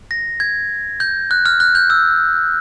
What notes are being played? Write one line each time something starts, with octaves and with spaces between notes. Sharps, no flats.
A#6
G#6
G6
F#6
F6
F#6
G6
E6